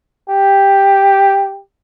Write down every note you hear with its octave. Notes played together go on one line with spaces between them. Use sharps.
G4